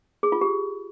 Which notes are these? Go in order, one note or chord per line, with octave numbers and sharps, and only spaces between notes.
G#4
F4
G4